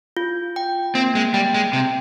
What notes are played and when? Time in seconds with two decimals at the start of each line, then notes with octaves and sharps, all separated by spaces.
0.17 F4
0.56 G5
0.95 A#3 C4
1.15 G#3
1.34 G3 G5
1.54 G#3
1.73 C3 G5